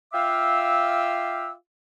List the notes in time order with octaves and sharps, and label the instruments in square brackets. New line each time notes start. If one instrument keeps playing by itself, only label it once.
[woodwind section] F4 E5 F5 G5 D6 E6